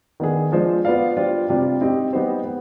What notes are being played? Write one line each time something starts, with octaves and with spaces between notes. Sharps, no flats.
D#3 B3 D4 G#4
F3 G#3 D4 F4 C5
B3 F4 B4 D5 F5
G3 D4 F4 C5
C3 G3 D4 F4
C4 D#4 G4
G3 B3 D#4 G4 C5
B3